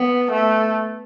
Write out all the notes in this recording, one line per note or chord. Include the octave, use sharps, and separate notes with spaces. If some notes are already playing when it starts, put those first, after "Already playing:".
Already playing: B3
A3